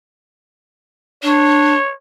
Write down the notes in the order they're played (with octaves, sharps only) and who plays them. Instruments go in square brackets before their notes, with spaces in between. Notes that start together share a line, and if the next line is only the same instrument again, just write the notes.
[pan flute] D4 [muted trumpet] C#5